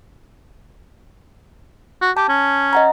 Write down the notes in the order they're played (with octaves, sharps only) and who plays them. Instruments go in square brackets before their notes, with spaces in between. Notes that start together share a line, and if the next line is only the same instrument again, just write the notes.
[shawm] F#4
[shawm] G4 [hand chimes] A5
[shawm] C#4
[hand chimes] D#5 F#5 A#5